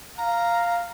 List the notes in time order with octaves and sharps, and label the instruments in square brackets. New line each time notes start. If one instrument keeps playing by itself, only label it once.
[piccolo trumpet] F5 [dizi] A#5